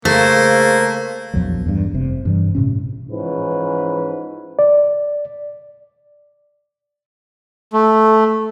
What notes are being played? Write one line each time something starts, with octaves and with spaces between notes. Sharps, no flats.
C#3 A3 A#3 C5
A#1 E2 F3 F#3
E2 G2
F1 C3
G2 E3 G3
A2 C3 C#4
G#2 E3 F3 C#4 B4
D5
A3